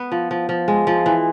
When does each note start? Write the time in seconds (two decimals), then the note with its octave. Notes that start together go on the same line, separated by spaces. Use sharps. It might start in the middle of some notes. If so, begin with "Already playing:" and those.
Already playing: B3
0.12 F3
0.31 F3
0.49 F3
0.68 G#3
0.87 F3
1.06 E3